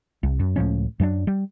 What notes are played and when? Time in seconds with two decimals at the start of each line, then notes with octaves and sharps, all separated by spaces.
0.23 C2
0.40 F#2
0.56 C#2 A2 F3 C#4
1.00 F#2 F#3 A#3 D4
1.27 G3